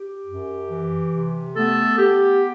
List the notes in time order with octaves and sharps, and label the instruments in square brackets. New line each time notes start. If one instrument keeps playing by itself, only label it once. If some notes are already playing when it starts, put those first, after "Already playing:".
Already playing: [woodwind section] G4
F#2
E3
C3
A3 B3 A4
B3 G4